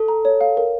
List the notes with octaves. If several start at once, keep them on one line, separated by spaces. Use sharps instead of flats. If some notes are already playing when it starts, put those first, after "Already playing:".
Already playing: A4
A#5
C#5
F5
A#4